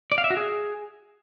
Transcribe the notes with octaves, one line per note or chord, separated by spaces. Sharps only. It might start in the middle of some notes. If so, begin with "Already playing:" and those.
D5
F5
E5
F#4
G#4